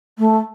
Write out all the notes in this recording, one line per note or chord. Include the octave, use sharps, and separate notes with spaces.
A3